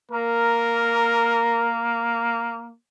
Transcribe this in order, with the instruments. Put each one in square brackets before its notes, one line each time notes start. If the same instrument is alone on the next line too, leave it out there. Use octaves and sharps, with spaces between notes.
[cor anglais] A#3 [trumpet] A#4